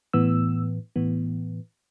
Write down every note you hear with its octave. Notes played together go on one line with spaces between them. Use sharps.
A2 E3 B3 E6
A2 E3 B3